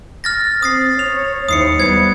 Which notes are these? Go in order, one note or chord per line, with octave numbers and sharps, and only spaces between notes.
F6 A6 A#6
C4 D#6 A6 C7
C#5 F7
D#2 E4 C5 D#6 C7 C#7
G3 B3 G#6 C#7